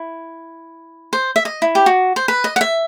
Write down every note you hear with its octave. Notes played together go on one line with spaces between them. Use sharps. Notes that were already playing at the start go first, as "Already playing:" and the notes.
Already playing: E4
C5
E5
D#5
E4
G4
F#4
C5
B4
D#5
F#5
E5